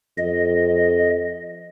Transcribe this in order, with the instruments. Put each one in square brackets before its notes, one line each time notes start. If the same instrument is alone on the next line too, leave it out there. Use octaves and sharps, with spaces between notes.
[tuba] F2 [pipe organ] D#5